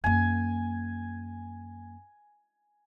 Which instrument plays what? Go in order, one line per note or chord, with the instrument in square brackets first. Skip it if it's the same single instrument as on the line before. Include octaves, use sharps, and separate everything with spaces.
[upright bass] F#2 A#3 [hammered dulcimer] G#5